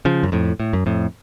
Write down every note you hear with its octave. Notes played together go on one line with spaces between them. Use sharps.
C#3 F3
F#2
F2 A2
A2
F#2
F2 A2